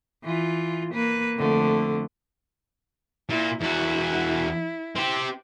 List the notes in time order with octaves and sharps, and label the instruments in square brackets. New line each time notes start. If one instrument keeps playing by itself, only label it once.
[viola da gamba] E3 F4
A#3 B4
F2 D3 A3
[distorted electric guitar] A#2 [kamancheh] E4
[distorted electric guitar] E2 F#4 [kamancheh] E4
[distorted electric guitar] C4 G4